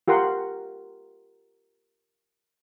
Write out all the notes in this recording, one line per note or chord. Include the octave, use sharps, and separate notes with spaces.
F4 G4 A#4 F#5 C6